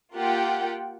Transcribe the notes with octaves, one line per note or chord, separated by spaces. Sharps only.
A#3 F4 G4 F#5 G5